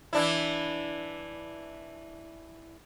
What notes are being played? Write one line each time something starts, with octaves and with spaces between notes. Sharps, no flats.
E3 D4 E4